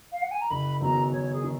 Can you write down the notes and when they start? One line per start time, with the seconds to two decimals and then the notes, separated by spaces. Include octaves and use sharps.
0.12 F5
0.21 F#5
0.31 G#5
0.41 A#5
0.50 F#1 B5
0.81 F#2 D#3 F#3 B3 A#5
1.12 F#1 C#5
1.32 G#4
1.44 D#3